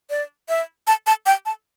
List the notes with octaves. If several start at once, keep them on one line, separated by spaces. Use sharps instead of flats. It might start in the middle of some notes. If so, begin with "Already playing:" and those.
D5
E5
A5
A5
G5
A5